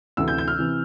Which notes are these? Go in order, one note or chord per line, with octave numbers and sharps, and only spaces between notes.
D2 C3 E3 E6
G6
G6
F6
C3 E3